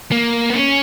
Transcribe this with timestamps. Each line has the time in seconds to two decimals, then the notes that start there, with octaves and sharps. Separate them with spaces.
0.12 A#3
0.50 B3
0.55 C#4